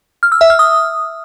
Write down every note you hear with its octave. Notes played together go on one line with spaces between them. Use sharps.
F6
E6
E5
F6
D#6